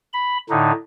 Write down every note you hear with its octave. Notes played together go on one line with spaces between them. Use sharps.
B5
A2 D3 D#4